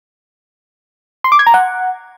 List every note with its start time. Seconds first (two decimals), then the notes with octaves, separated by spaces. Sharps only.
1.24 C6
1.32 D6
1.39 G#6
1.47 A#5
1.54 F#5